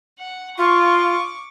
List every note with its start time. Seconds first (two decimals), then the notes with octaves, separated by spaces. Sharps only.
0.19 F#5
0.57 F4 C#6 D6